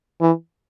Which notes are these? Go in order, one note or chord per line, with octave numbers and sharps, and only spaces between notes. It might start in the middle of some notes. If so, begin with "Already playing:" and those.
E3